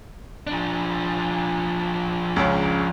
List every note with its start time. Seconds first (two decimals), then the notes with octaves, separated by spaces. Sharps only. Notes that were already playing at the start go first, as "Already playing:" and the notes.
0.47 F3 D4
2.36 C#2 C#3